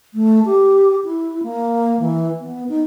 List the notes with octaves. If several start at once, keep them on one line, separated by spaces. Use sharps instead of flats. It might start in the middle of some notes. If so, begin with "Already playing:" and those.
A3
G4
E4
A#3
E3
B3
D#4